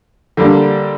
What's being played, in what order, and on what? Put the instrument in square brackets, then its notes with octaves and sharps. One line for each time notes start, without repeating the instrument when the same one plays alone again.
[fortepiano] D3 G3 A#3 D4